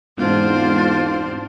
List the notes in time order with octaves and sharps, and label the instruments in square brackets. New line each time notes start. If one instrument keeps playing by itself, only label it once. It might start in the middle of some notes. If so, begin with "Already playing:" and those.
[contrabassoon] E1 [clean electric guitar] C2 G#2 [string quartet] C4 D4 C5 [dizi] F4